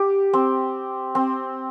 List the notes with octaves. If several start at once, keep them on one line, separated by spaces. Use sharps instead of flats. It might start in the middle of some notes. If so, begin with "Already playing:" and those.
Already playing: G4
C4
C4